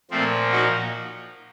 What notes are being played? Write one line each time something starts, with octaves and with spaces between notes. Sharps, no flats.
A#2 F3 A3 C4
D#4 F#4